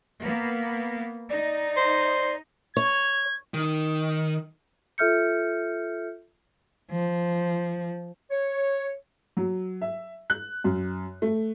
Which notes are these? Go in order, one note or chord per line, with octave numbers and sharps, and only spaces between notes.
A#3 B3
D#4 D5
C5
C#5 G#6
D#3
F4 A4 E5 F6 G6 C#7
F3
C#5
F#3
E5
F#6
F#2
A3